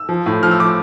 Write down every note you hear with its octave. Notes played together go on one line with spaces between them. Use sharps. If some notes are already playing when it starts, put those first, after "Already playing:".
Already playing: E6
F3
A2
F3 F6
E6
F3 D6